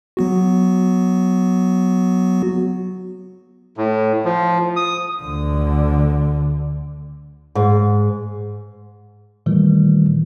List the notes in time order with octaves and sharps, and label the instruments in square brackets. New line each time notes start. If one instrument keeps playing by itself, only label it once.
[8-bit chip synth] F#3 B3 F#4
[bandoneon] A2
F3
D#6
[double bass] D2 D3
[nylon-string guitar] G#2
[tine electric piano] A#2 D#3 E3 G3 A3